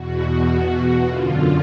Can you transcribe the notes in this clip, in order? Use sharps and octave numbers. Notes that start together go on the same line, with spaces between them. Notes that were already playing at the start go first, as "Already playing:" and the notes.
Already playing: E2 B2 F#4
F#2 D3 F4